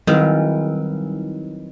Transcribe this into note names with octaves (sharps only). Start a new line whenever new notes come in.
D#3 F#3 G3 C4 D#4 E4 B4